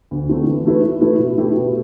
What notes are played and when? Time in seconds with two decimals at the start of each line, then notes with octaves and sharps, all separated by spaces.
0.11 D2
0.29 D3 A3 C4 E4
0.47 E3
0.66 A3 E4 B4
0.83 E3
1.00 A3 E4 B4
1.19 B2
1.38 A3 E4 G4
1.55 B2